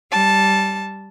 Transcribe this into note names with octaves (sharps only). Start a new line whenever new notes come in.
G3 A5